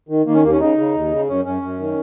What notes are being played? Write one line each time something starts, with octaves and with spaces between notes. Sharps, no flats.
D#3
D#3 A#3
C#4
D#2 A#3
C#4
C#3 D#4
C#3
D#2
C#3
F#2 C#4
F#2 C#4
F#2
D#3